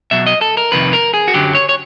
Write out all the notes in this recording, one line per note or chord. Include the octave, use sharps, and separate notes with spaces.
B2 F#3 E5
D#5
A4
A#4
F2 C3 D#3 B4
A#4
G#4
F#4
F#2 D3 F#3 G4
C#5
C#5